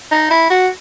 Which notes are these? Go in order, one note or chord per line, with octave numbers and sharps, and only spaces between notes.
D#4
E4
F#4